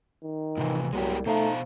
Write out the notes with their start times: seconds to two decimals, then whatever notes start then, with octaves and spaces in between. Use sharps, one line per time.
0.23 D#3
0.57 A2 C3 E3 F3
0.93 C2 F#3 G#3 B3 G4
1.26 B2 A3 D#4 C5 F5